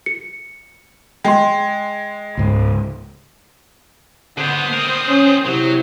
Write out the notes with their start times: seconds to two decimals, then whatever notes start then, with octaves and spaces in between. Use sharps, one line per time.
0.06 C#7
1.25 G#3 G5 C6
2.37 C#2 G#2
4.38 D3 B3 C5 D#6
4.74 C4 A#4
5.09 C#4
5.46 C3 F#3 E4